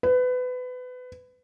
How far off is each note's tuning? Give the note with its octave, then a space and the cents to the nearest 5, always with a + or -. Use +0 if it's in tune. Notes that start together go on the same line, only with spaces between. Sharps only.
B4 +25